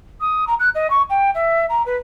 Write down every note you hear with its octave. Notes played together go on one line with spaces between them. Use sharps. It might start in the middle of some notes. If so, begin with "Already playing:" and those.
D#6
A#5
F#6
D#5
C#6
G5
E5
A#5
B4